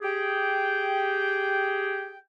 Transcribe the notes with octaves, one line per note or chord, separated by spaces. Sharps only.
G4 G#4 G5